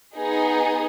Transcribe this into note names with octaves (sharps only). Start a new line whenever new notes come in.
B3 D#4 G#4